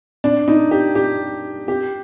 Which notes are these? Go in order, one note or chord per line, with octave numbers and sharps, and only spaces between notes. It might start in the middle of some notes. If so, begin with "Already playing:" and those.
D4
D#4
G4
G4
G4